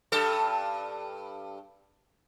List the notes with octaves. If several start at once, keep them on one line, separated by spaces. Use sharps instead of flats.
G2 A4